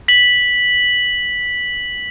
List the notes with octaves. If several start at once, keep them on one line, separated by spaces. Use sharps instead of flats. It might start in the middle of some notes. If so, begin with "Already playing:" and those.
B6 F#7